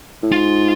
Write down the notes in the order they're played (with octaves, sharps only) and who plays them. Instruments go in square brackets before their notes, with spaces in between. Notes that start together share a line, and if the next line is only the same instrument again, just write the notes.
[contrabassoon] A2
[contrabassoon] G#2 [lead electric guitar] F4